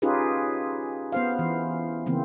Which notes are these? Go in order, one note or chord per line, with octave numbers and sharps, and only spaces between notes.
C#4 D#4 F4 G4 G#4 B4
B3 C5 F5
E3
C#3 E3 A#3 C4